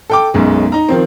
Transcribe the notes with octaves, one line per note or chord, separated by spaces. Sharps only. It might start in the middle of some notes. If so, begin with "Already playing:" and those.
A4 G5 D6
B1 F#2 B2 G#3
D#4 A#5
D#3 F3 C4